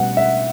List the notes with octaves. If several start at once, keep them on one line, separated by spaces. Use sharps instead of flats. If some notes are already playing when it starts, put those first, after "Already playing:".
Already playing: B2 G3 B3 F#5
E5